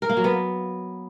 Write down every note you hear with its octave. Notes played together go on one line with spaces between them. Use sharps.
A#4
A#3
F#3
B3